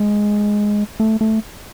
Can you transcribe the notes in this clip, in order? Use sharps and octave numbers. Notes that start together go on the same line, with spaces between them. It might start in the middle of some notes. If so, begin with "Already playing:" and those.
Already playing: G#3
A3
A3